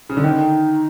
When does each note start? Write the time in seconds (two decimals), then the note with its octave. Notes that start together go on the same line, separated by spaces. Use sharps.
0.09 C#3
0.17 D3
0.24 D#3 D#4